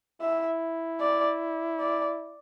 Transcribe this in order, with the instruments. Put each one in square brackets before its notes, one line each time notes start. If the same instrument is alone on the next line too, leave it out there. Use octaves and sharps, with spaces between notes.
[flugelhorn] E4 [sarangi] E5
[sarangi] D5
D5